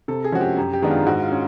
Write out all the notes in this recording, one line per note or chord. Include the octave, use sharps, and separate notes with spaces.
C3 A4
G#4
F3 G#3 C#4 F#4
G4
F#2 G4
G4
D#3 G#3 B3 D4
F4
G#2 F#4
F4
C#4